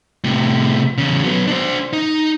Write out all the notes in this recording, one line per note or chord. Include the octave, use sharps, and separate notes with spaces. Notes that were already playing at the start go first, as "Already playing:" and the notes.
A2 C3
E2 C#3
F#3 B3
D4 C5
D#4